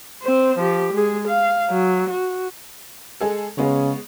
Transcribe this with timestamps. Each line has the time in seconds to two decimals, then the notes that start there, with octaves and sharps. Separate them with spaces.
0.22 C4 C5
0.59 F3 G4
0.93 G#3 G#4
1.28 F5
1.70 F#3
2.10 F#4
3.21 G#3 G#4 A4
3.58 C#3 G#3 B3 C#5